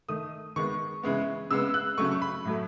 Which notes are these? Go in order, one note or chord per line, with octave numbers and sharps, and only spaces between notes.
D#3 A3 D#6
D#3 G#3 B3 C#6
C#3 E3 G#3 B3
C#3 G#3 B3 E6
F#6
C#3 F#3 A3 C#6
C#6
B5
A2 F#3 A3